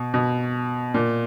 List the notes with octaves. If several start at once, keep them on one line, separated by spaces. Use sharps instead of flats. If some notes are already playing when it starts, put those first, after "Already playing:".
Already playing: B2
B2
A#2